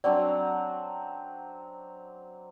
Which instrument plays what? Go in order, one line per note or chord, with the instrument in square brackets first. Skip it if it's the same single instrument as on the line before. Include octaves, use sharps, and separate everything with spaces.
[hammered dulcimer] F#3 C4 D4 [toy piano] D5